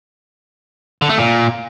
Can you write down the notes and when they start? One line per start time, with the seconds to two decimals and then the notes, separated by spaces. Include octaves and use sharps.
1.02 D3
1.09 A3
1.17 A#2